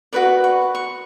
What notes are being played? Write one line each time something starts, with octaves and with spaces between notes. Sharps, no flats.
F#4 B4 D5 C#6
C#6
C#6